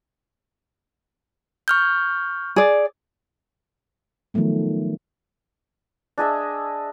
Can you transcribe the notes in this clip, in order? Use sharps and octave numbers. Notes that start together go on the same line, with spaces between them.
C#6 F6 G6
G#4 D5
D#3 F3 F#3 A3 B3
D4 G#4 D#5 E5